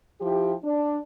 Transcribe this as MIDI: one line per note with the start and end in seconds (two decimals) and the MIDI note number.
0.21 0.53 53
0.21 0.53 64
0.21 0.53 67
0.64 0.99 62